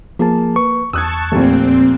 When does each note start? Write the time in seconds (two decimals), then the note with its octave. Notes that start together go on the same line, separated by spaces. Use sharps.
0.19 F3 A#3 G#4 A5
0.56 B4 C#6
0.93 E2 A5 C#6 D#6 E6 F#6 G#6
1.32 F1 A#2 A3 C4